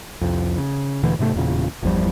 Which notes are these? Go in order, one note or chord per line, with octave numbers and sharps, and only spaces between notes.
C2 F2
C#3
D2 A#2 D3 E3
G#2 C3 F#3 A3
E1 E2 A#2 C#3
G1 E2 F3 G3